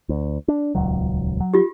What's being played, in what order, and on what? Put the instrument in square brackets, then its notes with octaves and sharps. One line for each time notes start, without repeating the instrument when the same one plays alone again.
[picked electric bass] D2
D4
D#1 C#2 F#3
F#3
[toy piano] F4 G4